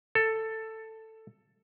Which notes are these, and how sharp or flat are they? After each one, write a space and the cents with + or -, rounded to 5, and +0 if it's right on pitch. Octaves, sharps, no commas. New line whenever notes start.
A4 +10